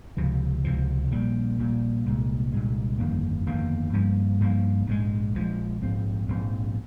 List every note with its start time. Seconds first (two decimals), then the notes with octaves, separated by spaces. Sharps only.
0.17 C#2 C3 F3
0.65 C#2 C3 F3
1.11 A#1 A#2 G3
1.58 A#1 A#2 G3
2.06 C2 A#2 G#3
2.52 C2 A#2 G#3
2.99 G1 F2 D#3 A#3
3.46 G1 F2 D#3 A#3
3.93 G2 F3 A#3
4.40 G2 F3 A#3
4.87 A#1 G#2 F3 G#3
5.34 A#1 G#2 F3 G#3
5.81 A#1 G#2 F3 C4
6.28 A#1 G#2 F3 C4